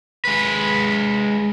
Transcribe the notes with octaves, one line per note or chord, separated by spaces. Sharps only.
G#3 B4